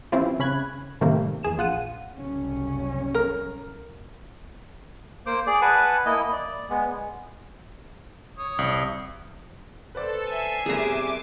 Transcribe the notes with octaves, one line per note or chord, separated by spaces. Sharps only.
E3 G3 C4 C#4 E4 F4
C#3 C#4 B5 F#6 G#6
A2 C3 D#3 G3 A3 A#3
E2 G#4 E7
A#1 F4 F#5 D#7
F#1 C2 C#4
A#4
A#3 C5 D6
G#4 D5 D6
B4 F#5 G#5 A5
A#3 E4 D#5
D5
G#3 B3
C#5 D#6
C2
A4 B4 C5 D5
E5 G#5 C7
G1 C3 G#4 A#4 A#5 D6